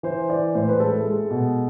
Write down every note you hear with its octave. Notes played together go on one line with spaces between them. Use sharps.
E3 C5
E3 D5
A2 C5
B4
G#3 A4
G#3
B2